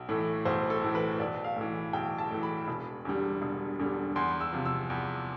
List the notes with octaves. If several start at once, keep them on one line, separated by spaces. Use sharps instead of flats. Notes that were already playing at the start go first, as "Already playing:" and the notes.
Already playing: B1
A2 E3 A3
B1 C5
A4
A2 E3 A3
B4
B1 D5
F5
A2 E3
B1 G5
A5
A2 E3
B5
E1
E2 D3 G3
E1
E2 D3 G3
E2 C6
E6
C3 F3
E6
E2